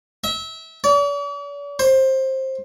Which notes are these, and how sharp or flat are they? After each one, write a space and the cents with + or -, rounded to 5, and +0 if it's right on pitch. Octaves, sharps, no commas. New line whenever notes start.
E5 -25
D5 -45
C5 +20